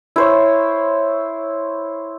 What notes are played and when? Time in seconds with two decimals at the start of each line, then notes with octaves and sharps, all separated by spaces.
0.16 E4 C5 C#5